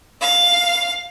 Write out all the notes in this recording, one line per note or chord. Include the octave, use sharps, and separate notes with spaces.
F5